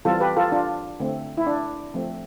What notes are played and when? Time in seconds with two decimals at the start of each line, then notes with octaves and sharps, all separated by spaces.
0.05 E3 G3 C4 F4 A4
0.20 G4 B4
0.36 F4 A4
0.52 D4 F4
1.00 D3 A3 C4
1.37 E4
1.47 D4
1.94 F3 A3 C4